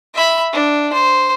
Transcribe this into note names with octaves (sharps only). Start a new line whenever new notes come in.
E5 B5
D4
C5